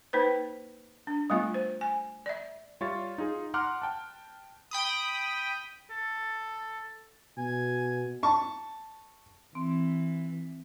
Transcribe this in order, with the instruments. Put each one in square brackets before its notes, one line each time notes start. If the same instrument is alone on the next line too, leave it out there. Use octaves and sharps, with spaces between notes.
[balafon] A#3 D#4 B4 C5
D4
G3 A3 B3 F4
C5
G#5
D5 E5
[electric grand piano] G3 F4 C#5 E5 C#6 A6
D#4 F4 G#4
F#5 A#5 C6 D6 F6 F#6
G5 A5
[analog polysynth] G5 B5 D#6
[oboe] A4
[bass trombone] B2 [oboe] G#5
[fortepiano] A5 C#6
[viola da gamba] E3 [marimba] C4